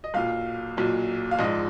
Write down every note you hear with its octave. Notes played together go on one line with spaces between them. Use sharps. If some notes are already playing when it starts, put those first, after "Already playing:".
D#5
B1 A#2 F#3 F5
B1 A#2 F#3
F5
A#1 G#2 F3 D#5